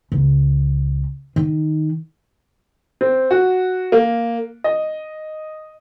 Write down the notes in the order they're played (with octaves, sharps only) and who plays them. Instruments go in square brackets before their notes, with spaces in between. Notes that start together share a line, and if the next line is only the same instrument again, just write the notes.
[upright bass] C#2
D#3
[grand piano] C4
F#4
A#3
D#5